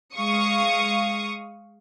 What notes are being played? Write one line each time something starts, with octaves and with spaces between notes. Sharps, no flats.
G#3 F5 C#6 D#6